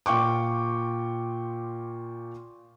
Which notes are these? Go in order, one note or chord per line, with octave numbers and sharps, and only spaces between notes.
A#2 F4 G5 C#6 D6